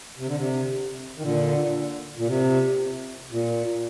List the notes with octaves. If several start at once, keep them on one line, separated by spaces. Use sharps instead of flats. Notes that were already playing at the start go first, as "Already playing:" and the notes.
C3
D3
C3
D#3
A#2 D3
A#2
C3
A#2